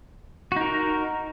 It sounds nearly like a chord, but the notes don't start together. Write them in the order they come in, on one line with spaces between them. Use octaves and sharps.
F#4 D#4 A#4